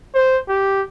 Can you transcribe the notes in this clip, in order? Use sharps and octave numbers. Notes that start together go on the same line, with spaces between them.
C5
G4